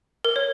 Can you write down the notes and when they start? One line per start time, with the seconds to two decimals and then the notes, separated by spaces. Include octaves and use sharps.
0.25 A#4
0.36 C#5